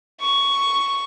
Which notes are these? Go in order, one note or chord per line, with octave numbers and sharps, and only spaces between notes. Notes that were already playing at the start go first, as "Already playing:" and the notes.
C#6